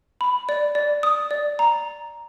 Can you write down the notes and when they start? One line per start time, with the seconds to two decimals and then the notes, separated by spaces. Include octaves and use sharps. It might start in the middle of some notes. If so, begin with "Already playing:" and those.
0.21 B5
0.49 D5
0.75 D5
1.03 D#6
1.31 D5
1.59 A#5